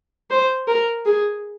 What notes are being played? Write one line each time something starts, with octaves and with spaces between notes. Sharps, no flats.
C5
A#4
G#4